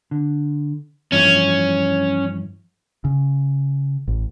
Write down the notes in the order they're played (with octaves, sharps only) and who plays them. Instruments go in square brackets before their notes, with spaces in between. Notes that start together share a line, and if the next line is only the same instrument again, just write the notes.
[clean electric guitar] D3
[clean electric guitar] G2 E3 F3 [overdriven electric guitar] C#4
[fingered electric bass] C#3
A1